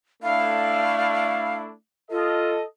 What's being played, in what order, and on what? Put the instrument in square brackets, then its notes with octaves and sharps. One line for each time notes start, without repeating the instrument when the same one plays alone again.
[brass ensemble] A3 D4 E4 [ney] F5
[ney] F4 [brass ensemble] A4 D#5